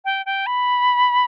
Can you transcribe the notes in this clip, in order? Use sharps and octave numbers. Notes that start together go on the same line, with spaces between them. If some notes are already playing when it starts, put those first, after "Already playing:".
G5
G5
B5